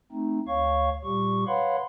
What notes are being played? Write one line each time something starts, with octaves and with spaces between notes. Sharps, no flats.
A3 C4 D#4
D2 C#5 F5 C#6
A#2 G3 G4 C#6
B4 C#5 F5 F#5 B5 C6